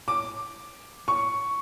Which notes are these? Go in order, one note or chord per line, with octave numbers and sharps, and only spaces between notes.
D6
C#6